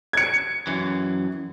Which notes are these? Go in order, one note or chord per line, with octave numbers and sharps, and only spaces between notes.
G#6 C#7
F#2 E3